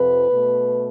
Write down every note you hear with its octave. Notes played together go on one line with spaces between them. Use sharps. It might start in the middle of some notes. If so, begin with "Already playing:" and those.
Already playing: F2 C3 F3 B4
B2 A3